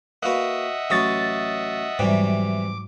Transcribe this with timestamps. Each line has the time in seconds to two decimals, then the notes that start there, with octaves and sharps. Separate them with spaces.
0.23 A#3 F#4 B4 D#5 E5 F#5
0.90 A1 F#3 C#5 D#6 A6
1.99 G#2 C3 E3 F#3 G3 D6